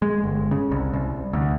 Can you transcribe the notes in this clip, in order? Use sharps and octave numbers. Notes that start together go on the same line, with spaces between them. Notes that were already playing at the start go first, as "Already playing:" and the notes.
G#3
G1
C#3
C2
C2
D2